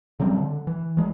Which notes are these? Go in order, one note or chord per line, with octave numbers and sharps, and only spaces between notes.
C#3 F#3 G3 C4
D3
E3
E3 G#3